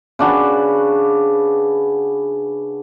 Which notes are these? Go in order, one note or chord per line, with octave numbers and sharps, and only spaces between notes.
C#3 D4 F#4 B4